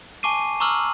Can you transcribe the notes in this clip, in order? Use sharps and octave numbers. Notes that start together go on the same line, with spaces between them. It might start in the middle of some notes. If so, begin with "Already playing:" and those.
G#5 A5 C#6 D6 C7 D#7
A#5 C#6 D6 E6 F6 F#7